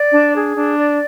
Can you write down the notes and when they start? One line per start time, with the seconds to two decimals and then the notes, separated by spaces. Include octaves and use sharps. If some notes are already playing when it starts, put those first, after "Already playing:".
Already playing: D5
0.11 D4
0.34 G#4
0.56 D4
0.78 D5